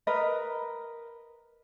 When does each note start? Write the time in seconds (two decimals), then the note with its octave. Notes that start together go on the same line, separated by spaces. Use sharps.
0.07 A#4 B4 D#5